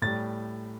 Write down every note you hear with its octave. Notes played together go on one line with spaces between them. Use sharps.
A2 G3 A6